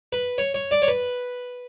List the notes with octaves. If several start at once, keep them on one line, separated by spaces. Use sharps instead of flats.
B4
C#5
C#5
D5
C#5
B4